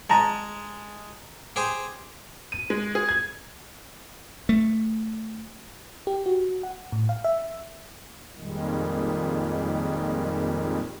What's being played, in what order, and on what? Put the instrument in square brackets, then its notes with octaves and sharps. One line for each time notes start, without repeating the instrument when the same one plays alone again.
[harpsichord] G#3 [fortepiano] A5 A#5
[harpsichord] G4 G#4 C5
[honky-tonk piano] D#7
G#3
G#4
G#6
[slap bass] A3
[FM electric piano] G4
F#4
F#5
A2
F5
E5
[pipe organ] F2 A#2 D#3 G3 G#3